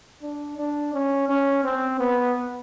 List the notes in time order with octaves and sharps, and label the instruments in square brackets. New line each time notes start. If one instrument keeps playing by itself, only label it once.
[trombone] D4
D4
C#4
C#4
C4
B3